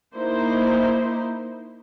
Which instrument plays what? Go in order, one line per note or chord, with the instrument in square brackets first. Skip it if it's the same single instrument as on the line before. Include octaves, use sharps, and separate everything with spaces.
[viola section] A#3 D#4 E4 C5